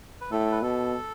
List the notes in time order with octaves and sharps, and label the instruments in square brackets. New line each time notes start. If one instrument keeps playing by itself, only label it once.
[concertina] B4
[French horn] A2 [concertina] A4
[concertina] B4
[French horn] B2 [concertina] A4